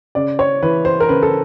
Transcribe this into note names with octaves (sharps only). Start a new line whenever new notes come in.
C#3 D5
C#5
E3 B4
C5
A#4
C#3 B4
A4